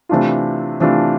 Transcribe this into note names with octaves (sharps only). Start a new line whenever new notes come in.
C3 E3 A3 D4 F4
C3 E3 A3 D4 F4